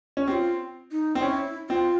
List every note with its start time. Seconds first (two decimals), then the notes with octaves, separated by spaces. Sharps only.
0.17 C#4
0.28 C4 F4 G4
0.91 D#4
1.15 C4
1.22 C#4 E4
1.69 C4 F4